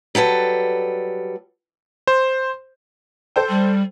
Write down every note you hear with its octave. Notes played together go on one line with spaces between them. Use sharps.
F#3 G3 A4 B4
C5
A4 C5 G5
G3